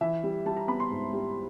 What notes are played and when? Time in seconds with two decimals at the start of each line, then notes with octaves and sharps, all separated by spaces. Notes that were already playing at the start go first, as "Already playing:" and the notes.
0.01 E3 E5
0.24 G3
0.46 G3 A5
0.57 A#5
0.68 B3 B5
0.80 C6
0.90 G#2
1.13 G3